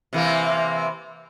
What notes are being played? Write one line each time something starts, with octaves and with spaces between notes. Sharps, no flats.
C3 E3 A#3